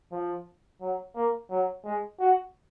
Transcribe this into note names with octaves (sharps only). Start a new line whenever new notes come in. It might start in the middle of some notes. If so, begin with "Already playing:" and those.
F3
F#3
A#3
F#3
G#3
F#4